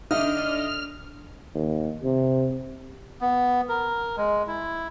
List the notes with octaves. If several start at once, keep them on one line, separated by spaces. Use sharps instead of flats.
D3 D4 D#4 D#5 E5 F6
D#2
C3
B3
A#4
G#3
E4